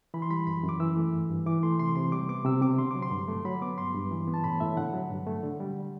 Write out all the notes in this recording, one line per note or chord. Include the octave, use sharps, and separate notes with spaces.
E3 B5
C6
G3 B5
F#2 B5
F#2
D6
E3 E6
A3
G2
G2
E3 D6
A3 C6
C3 C6
C3 C6
G3 D6
B3 D6
C3 E6
C3 D6
D3 C6
F#3 D6
C6
G2
A3
F#3 B5
B3 D6
G2 C6
G2
E3
B3
A5
A2 B5
A2 E5
D3 F#5
F#3
G2
A3
D3
G3